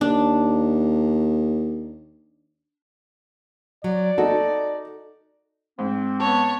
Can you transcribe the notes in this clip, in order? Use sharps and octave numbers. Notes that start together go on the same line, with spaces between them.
D#2 D4
F#3 D5
D#4 F#4 A4
G#2 C4
B3 C#5 A5